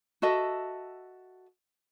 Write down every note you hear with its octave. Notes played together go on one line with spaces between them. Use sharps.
F#4 A4 D#5 E5